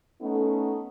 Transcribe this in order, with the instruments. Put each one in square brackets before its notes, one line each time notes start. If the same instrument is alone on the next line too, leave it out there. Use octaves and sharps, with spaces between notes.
[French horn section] A3 B3 C#4 D#4 A4